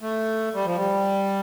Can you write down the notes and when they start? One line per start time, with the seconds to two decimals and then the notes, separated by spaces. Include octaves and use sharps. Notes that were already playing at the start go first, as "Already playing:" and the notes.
0.02 A3
0.54 G3
0.65 F3
0.77 G3